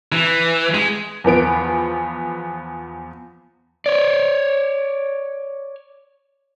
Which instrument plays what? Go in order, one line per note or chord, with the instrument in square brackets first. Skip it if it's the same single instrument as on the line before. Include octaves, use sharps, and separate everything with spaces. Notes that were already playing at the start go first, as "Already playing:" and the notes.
[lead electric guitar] E3
G#3
[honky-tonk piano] E2 F3 B3 D7
[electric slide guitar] C#5 D5